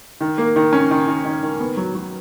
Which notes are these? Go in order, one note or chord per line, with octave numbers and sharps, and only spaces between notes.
D#3
A#3
D#3
C#4
D#3
D#3
D#3
D#3
B3
F#3
F#3